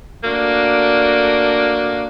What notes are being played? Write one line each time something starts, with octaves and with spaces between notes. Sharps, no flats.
A3 A#3 D4 F#4